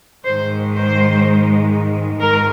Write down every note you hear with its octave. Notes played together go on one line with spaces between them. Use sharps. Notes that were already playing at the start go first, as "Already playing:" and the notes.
G#2 D#3 G#3 C5
C5
G#2 D#3 G#3 A#4